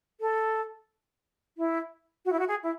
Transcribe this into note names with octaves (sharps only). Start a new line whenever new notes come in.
A4
E4
F#4
E4
F#4
G#4
E4